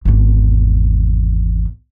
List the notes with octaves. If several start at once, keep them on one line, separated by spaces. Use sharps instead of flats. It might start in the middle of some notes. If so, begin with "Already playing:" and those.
G#1 E2